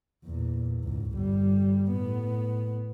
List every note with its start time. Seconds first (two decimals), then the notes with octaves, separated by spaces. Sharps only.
0.25 E2 A#2
0.80 C#2 G#2
1.13 G1 G3
1.91 A2 B3